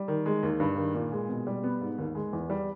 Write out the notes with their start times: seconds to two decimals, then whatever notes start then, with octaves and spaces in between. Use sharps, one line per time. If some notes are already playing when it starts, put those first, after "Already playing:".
Already playing: G3
0.08 D#3
0.26 G#3
0.43 D#2
0.60 G2
0.77 D#3
0.95 A#2
1.12 G#3
1.29 B2
1.47 G3
1.64 B3
1.81 G#2
1.98 D#2
2.15 G#3
2.33 E2
2.50 G3